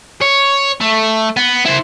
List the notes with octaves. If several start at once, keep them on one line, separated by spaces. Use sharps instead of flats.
C#5
A3
B3
E4 C5